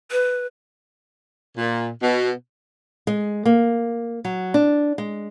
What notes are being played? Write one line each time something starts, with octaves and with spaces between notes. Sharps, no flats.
B4
A#2
B2
G#3
A#3
F#3
D4
G#3